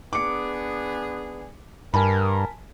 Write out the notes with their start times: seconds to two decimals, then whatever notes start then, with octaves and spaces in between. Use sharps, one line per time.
0.13 B3 D4 G#4 D6 C#7
1.94 G2 A#4 G#5 A5 B5